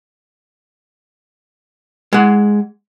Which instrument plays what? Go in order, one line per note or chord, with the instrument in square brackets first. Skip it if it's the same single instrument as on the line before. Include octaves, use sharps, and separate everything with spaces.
[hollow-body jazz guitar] G#3 F#5